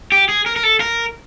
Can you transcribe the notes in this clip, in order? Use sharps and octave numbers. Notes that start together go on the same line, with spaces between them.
G4
G#4
A#4
A#4
A4
A#4